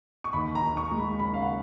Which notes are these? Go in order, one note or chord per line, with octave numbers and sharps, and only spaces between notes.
C#6
D#2 B5
A#5
D#4
C#6
G#3
B5
C#3 B5
F5
F#5